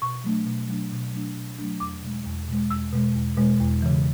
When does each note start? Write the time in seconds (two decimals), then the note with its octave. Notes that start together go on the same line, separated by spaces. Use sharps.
0.02 B2 C#6
0.24 F#3 A3 D4
0.46 B2
0.68 F#3 A3 D4
0.92 B2
1.13 F#3 A3 D4
1.37 B2
1.59 F#3 A3 D4
1.80 E2 D6
2.03 B2 G#3
2.26 E2
2.48 B2 G#3
2.70 E2 E6
2.92 B2 G#3
3.15 E2
3.37 B2 G#3
3.61 E2
3.82 C#3 E3